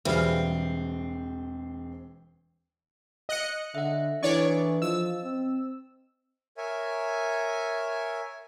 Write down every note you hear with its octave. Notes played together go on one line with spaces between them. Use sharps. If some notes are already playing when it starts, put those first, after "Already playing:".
E1 E3 G3 C4 F#4 G#4 F5
D#5 F#6 C#7
D3 E5 F#5
E3 D4 E4 A4 C#5 D5 C#6
F3 D#5 E6
C4
A#4 C#5 E5 G#5